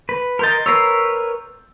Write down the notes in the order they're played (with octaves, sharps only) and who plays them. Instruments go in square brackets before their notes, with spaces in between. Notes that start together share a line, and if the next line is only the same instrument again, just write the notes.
[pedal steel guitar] B4
[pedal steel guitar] A#4 D#5 [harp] C6 G6 A6
[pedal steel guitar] A#4 B4 C#5 [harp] E6 A#6 C7